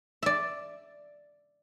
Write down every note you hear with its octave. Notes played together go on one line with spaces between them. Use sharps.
D5 E5